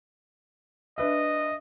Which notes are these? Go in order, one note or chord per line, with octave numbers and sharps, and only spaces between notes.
D4 B4 D#5 E5